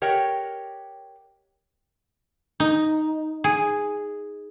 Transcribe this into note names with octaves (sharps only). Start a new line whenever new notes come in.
G4 A#4 C#5 D#5 F#5 G5
D#4
G#4